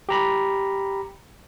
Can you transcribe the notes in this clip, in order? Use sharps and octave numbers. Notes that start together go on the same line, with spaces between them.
G4 A#5 B5